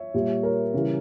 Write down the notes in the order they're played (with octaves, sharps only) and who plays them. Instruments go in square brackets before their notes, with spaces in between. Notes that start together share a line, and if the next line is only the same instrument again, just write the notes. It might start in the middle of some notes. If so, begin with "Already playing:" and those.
Already playing: [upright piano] C#5 E5
A#2 G3
A#4 C#5
C#3 E3 G3